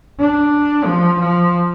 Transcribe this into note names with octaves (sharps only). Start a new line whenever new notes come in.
D4
F3
F3